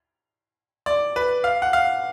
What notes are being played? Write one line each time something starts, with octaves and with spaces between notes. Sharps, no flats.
D5
B4
F5
F#5
F5